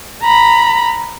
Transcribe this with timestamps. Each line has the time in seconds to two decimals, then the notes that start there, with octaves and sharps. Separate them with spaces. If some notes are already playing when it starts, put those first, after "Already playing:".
0.23 A#5 B5